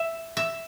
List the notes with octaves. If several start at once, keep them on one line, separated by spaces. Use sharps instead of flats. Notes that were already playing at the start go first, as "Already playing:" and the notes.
Already playing: E5
E5